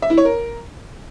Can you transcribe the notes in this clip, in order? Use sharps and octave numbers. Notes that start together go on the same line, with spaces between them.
E5
E4
C#5
A#4